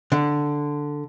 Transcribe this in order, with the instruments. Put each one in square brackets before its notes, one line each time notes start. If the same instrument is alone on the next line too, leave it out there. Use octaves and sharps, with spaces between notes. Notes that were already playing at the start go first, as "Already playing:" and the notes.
[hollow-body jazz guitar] D3